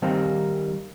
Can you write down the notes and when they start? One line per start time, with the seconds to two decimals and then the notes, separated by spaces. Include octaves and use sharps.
0.02 D#3 G3 A#3 C4 D#4